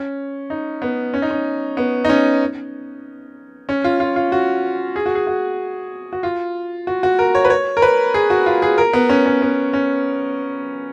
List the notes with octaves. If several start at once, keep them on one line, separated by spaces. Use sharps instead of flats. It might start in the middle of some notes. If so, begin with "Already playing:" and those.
Already playing: C#4
D#4
B3
C#4
D#4
C#4
B3
D#4
C#4
C#4
F4
F4
F4
F#4
G#4
F#4
G#4
F#4
F#4
F4
F#4
F#4
A#4
C#5
B4
C#5
A#4
B4
G#4
F#4
F4
G#4
A#4
B3
C#4
C#4
B3
C#4